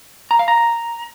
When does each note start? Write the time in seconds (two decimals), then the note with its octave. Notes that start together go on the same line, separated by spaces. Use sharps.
0.31 A#5
0.39 F5
0.48 A#5